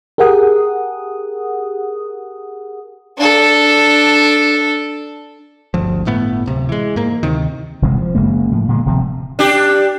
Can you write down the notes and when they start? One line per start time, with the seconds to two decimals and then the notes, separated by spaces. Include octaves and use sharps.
0.18 G4 G#4 A#4 F#5 D#6
3.18 D4 A4
5.74 G1 D2 F3
6.06 G1 A2 A3 B3
6.46 D1 C3
6.69 E3 G#3
6.96 G#2 A#3
7.23 D2 C3 D#3
7.82 D#1 C3 E3 G#3
7.97 F3
8.15 F#1 C#3 G#3 A#3
8.52 A2 F3
8.69 A#2 D3 G3 G#3
8.86 D1 C3 F3 C4
9.39 D4 G4